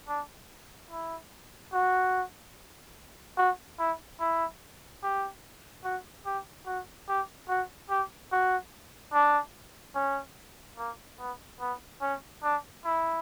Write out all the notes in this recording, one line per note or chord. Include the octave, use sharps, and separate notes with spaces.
D4
E4
F#4
F#4
E4
E4
G4
F#4
G4
F#4
G4
F#4
G4
F#4
D4
C#4
A#3
B3
B3
C#4
D4
E4